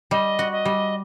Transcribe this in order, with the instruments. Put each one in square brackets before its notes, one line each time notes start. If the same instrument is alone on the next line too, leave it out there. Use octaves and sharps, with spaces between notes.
[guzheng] G3 [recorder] D#5
[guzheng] F#4
[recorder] D#5
[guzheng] G3